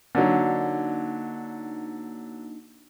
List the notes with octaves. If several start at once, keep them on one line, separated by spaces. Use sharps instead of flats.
D3 F#3 A#3 D4 D#4